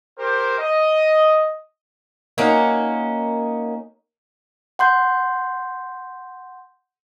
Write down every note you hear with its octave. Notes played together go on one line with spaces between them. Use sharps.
G4 A#4 C5
D#5
A#3 C#4 D#4 F#4
F#5 C6 G6